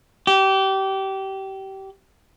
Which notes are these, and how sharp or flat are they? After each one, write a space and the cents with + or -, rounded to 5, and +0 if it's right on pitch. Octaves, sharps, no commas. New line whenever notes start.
G4 -25